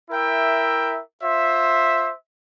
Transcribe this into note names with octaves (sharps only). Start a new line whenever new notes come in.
E4 A#4 E5 G5
F4 C5 E5